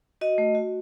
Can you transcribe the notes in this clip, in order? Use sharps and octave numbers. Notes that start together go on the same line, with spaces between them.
F#4 D#5
A3
F#4